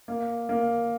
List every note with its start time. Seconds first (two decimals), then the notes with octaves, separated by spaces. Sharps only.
0.08 A#3
0.49 A#3